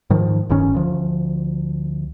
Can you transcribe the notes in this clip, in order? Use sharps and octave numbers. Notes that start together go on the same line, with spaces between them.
G#2 D#3 F3
D1 G2 D#3 C#4
D2 F3